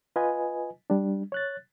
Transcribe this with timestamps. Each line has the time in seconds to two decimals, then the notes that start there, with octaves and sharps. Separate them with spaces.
0.16 F4 B4 D#5 G#5
0.90 G3 D4
1.32 C#5 F#6 A6